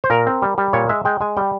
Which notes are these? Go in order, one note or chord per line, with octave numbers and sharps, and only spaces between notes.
C5
A#2 A#4
C4
G3
G3
A#2 C#5
G#3 E5
G#3 G5
G#3 G#5
G3 G5